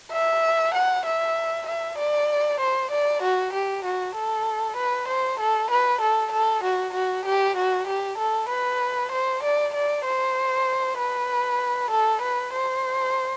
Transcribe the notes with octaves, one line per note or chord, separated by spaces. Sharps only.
E5
F#5
E5
E5
D5
C5
D5
F#4
G4
F#4
A4
B4
C5
A4
B4
A4
A4
F#4
F#4
G4
F#4
G4
A4
B4
C5
D5
D5
C5
B4
A4
B4
C5